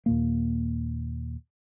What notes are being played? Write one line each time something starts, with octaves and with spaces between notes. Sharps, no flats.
D#2 A#2 A#3